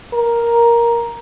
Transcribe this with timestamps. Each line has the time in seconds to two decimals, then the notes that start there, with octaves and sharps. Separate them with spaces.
0.14 A#4